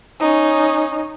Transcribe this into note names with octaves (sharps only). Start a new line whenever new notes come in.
C#4 D#4